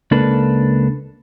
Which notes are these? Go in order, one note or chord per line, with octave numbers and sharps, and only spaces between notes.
C#2 A#3 D4 A4 B4